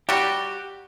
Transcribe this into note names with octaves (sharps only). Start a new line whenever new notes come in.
G3 F#4 G4